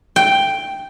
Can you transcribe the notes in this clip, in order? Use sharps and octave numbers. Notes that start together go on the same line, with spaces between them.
G5